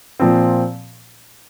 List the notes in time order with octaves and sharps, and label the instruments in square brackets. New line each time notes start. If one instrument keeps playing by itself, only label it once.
[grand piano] A#2 F3 C4